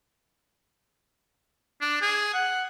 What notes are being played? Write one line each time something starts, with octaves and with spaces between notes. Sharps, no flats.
D4
G#4
F#5